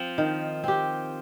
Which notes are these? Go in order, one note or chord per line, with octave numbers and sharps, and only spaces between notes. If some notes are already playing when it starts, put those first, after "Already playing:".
Already playing: F3 C4
D#3
C4 G4